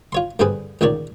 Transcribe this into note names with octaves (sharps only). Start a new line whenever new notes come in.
F4 C#5 C6
G2 D3 G3 C4 G#4 B4
C#2 A#2 D#3 C#5 D5